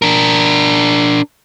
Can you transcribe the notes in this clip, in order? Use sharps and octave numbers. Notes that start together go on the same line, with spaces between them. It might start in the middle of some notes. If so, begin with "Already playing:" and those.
D4 A#4